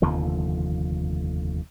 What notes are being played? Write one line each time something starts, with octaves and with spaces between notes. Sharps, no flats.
F1 D#2 D3 F3